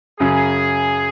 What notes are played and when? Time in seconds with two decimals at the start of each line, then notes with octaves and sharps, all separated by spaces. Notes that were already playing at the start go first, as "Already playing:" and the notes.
0.20 F#2 C#3 F#3 G#4